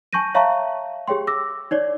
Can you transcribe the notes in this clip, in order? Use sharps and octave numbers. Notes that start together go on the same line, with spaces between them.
G#5 A5 C#6 G6 A#6 D#7
C#5 E5 F5 A5 A#5 C#6
G4 G#4 C#5 G5 C6
D6 E6 A#6
D#4 C#5 D5